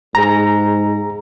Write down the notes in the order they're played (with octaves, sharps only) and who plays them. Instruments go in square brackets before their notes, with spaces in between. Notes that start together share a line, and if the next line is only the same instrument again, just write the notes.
[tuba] G#2 [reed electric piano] G#4 A#5